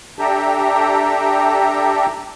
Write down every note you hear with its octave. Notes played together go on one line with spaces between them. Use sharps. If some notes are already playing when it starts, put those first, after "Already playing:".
D4 G4 A4 E5 G5 A#5